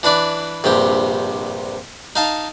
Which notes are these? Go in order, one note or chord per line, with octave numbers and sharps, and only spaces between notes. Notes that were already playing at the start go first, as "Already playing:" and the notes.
E3 D4 B4 D5
A#1 G2 C3 G4
D#4 F5 A5